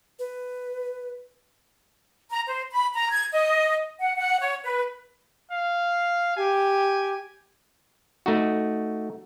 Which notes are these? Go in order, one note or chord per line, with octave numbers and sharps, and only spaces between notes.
B4
A#5
C5
B5
A#5
G#6
D#5
F#5
F#5
C#5
B4
F5
G4 G#5
A3 D#4 F#4